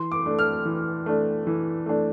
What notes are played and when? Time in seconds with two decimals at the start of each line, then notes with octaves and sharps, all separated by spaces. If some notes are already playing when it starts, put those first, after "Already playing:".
Already playing: E3 C6
0.12 D6
0.26 A3 D4
0.39 F6
0.65 E3
1.06 A3 D4
1.47 E3
1.86 A3 D4